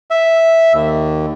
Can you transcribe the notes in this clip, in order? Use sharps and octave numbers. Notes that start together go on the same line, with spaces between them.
E5
D#2